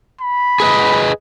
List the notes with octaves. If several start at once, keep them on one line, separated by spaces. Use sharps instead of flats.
B5
G#4 B4 D#5